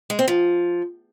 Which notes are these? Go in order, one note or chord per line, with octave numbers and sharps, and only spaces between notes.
G#3
C4
F3